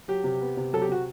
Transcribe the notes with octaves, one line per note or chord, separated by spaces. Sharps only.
F#3 G4
C3
B3
C3
F#3 A4
G4
C3 F#4